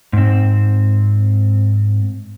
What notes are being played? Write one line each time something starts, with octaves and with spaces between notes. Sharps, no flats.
G#2 C4